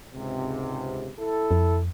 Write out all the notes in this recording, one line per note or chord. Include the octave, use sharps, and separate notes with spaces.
C#2 G#2 C3
E4 A4
F2